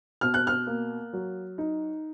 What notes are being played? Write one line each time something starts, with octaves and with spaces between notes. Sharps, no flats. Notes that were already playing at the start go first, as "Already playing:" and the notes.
B2 F6
F#6
F6
A#3
F#3
D#4